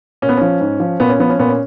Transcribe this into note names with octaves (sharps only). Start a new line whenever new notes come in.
A#2 C#4
B3
F3 C#4
G#2
F3
A#2 B3
C#4
F3 B3
C#4
A#2 B3
C#4